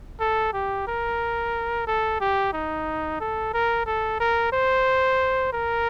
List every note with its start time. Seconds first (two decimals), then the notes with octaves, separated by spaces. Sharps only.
0.20 A4
0.53 G4
0.88 A#4
1.87 A4
2.21 G4
2.53 D#4
3.20 A4
3.54 A#4
3.86 A4
4.20 A#4
4.53 C5
5.53 A#4